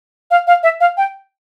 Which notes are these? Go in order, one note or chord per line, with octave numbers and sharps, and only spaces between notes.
F5
F5
E5
F5
G5